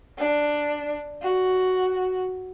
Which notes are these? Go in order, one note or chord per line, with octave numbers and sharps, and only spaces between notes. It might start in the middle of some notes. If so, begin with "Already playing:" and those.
D4
F#4